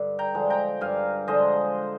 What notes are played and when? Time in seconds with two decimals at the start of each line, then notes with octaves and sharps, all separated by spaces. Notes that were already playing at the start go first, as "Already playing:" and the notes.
Already playing: G2 D3
0.19 G5 A#5
0.35 D3 F3 G#3
0.50 G5 A#5
0.81 G2 F5 G#5
1.28 D3 F3 G#3 C5 D#5